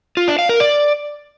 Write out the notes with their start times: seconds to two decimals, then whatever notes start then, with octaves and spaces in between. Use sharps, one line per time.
0.17 F4
0.28 D4
0.39 F5
0.49 A#4
0.60 D5